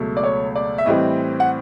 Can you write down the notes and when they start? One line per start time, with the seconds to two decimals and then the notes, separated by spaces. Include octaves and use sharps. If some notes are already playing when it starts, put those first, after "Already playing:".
Already playing: C#2 B2 F#3 A3
0.17 D5
0.23 C#5
0.55 D5
0.78 E5
0.86 A2 E3 G3 C4 D#5
1.40 F#5